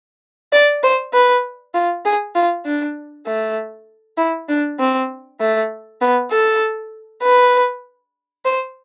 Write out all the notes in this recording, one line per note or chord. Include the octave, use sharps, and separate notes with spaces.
D5
C5
B4
F4
G#4
F4
D4
A3
E4
D4
C4
A3
B3
A4
B4
C5